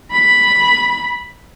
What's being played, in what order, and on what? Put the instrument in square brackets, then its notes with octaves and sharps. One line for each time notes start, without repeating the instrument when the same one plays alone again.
[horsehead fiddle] B5